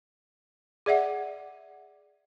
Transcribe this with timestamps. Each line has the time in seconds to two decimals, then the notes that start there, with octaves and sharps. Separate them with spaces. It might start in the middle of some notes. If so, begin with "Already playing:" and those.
0.86 G#4 D5 E5 F#5